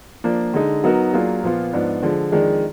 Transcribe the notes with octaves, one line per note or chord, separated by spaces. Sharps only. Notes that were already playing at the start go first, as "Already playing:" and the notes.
F3 A#3 D4
D3 G#3 D#4
F#3 B3 D#4 F#4 A#4
F#3 A#3 D4 F4 G#4
A#2 F3 B3 F4
G#2 F3 B3 D4
D3 F3 G#3
F2 D#3 G#3 D4